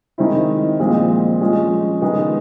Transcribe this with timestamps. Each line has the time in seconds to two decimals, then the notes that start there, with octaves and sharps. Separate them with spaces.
0.18 D#3 G#3 C4 E4
0.80 A#2 F3 G#3 C4
1.41 F3 G#3 C#4
2.01 D#3 G#3 B3